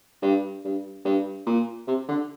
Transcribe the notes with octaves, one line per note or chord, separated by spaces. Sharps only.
G2
G2
G2
A#2
C3
D3